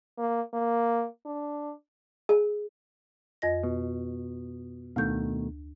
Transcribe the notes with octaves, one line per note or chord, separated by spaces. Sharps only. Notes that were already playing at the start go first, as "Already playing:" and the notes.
A#3
A#3
D4
G#4
F2 D#5 A#6
B2
D2 B2 D#3 A3 G6